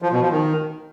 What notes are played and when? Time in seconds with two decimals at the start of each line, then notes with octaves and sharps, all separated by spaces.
0.02 F3
0.12 B2
0.22 F3
0.31 D#3